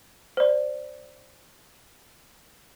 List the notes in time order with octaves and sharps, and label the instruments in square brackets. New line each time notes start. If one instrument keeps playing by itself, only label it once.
[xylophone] C5 D5